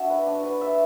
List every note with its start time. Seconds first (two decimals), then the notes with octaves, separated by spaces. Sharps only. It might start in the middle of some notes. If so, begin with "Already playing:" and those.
Already playing: D4 F#4 E5
0.10 B4
0.26 D4
0.43 B4
0.61 E5